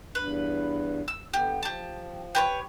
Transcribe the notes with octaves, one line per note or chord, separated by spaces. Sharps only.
E2 G2 B4
E6
D3 B3 G4
F3 G4 A5
G4 B4 C#5